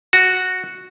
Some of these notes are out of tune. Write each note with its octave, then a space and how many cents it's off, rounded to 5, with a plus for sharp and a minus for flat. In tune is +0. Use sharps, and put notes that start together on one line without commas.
F#4 -5